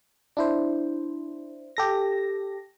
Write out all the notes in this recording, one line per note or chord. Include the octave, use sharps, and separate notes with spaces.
D4 E4 C5
G4 A4 A#6